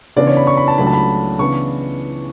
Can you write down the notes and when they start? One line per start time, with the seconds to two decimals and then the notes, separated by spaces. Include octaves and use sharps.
0.16 C#3 E3 B3 D4 D5
0.27 C#5
0.37 B5
0.47 C#6
0.57 B5
0.68 A5
0.78 C#2 C#3 F#3 A3 D4 B5
0.87 A5
0.93 B5
1.39 C#3 E3 B3 D4 C#6